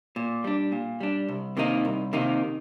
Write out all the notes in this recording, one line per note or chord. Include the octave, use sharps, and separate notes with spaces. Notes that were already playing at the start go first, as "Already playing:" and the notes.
A#2
G3 D4
A#2
G3 D4
C2
C3 D#3 A#3 D#4
C2
C3 D#3 A#3 D#4